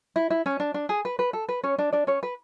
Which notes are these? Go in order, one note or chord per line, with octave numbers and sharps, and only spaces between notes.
E4
E4
C#4
D4
D4
G#4
B4
B4
A4
B4
C#4 C#5
D4 D5
D4 D5
C#4 C#5
B4